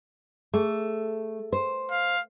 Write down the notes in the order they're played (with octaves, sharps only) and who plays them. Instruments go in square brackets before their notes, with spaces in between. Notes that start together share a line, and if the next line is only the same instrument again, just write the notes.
[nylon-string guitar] A3 [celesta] G#4
[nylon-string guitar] C5
[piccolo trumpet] F5